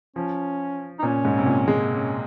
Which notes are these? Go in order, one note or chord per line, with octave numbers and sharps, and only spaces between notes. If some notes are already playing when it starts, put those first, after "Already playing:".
F3 C#4
D#4
A#2 C#4
G#2
C3
A#2
G#3
C#4